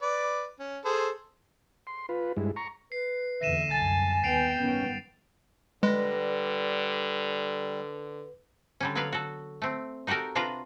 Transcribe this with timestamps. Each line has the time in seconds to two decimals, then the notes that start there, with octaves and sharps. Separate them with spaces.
0.02 B4 D5
0.59 C#4
0.85 G#4 A4 C5
1.87 C6
2.09 F4 B4
2.37 G2 G#3 E4
2.56 A#5 C#6
2.92 B4 C7
3.42 E2 A#2 D3 E5 A#6 D#7 E7
3.71 C2 F#2 G#5 A5 A6
4.24 D#2 B3 G5 C7 D7 F7
4.60 G2 D#3 B3 C#4
5.83 D3 G3 G#3 B4 A#6
8.80 D3 G3 C#4
8.95 F#3 B3 A4 B4 D5 F5
9.12 F#4 A4
9.62 A3 C4
10.07 D#4 F#4 G4 A4 A#4
10.35 C3 D4 F4 F#4 B4 A#5